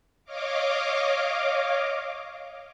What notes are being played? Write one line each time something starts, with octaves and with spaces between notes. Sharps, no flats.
C#5 D#5 F5 D6